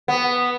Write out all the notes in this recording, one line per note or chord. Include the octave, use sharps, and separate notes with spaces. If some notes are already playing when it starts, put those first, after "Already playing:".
B3